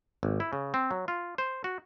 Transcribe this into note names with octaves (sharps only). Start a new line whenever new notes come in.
G#1
E4
C#3
C4
F#3
F4
C5
F#4